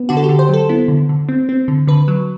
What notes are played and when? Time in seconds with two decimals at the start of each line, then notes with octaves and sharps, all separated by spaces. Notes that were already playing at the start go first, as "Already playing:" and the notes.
Already playing: B3
0.09 D3 F#4
0.17 A4
0.24 G4
0.29 D3
0.39 C5
0.49 F#3 A4
0.69 B3 E4
0.88 D3
1.09 D3
1.29 C4
1.49 C4
1.68 D3
1.87 D3 B4
2.08 F#3